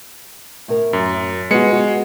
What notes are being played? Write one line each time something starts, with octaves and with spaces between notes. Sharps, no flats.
A2 A#4
F#2
G#3 B3 F#4 C#7
F#4